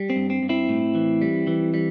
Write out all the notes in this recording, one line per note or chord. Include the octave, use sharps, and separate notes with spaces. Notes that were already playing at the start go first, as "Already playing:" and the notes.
Already playing: G3
C4
G2
C4
G2
C4 E4
A2
E3
G3
E3
G3